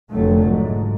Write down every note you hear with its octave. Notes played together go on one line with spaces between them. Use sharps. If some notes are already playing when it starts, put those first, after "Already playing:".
F1 F2 D3 F#3 A3
G#2